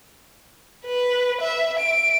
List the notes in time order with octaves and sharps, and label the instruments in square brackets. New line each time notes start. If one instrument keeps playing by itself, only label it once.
[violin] B4
E5
D7